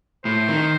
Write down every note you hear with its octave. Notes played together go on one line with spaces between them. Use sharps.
A2 C5
D#3